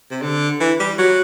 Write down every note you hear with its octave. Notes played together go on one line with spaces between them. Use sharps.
C3
D3
E3
G3
F#3